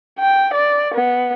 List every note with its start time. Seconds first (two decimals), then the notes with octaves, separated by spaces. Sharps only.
0.20 G5
0.54 D5
0.95 B3